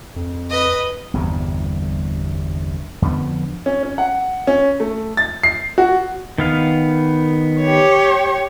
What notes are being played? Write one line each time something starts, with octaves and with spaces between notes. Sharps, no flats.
F2
B4 D#5
G1 E2 G2 C3
F2 D3 F3 B3
C#4
C#4
F#5
C#4
A3
A6
C7
F#4
D#3 B3 F5
G4 C#5